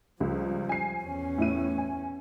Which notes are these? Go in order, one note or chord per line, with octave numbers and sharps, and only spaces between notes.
C#2 F3 G3
G#5 C7
E2 C#4
A2 E4 D#7
G#5